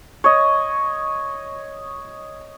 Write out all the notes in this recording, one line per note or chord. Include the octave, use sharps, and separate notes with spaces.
C#5 D#5